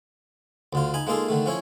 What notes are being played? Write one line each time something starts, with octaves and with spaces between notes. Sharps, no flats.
D2 D3 F4
D#4 G#5 B5
G#3 A#3 D#4 F4 G#4 A4
D3 D#3 A3
F3 C#4 E4 C#5